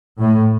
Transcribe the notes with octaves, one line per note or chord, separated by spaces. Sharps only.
A2